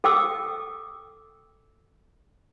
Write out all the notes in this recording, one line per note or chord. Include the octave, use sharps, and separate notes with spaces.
A4 G5 D6 E6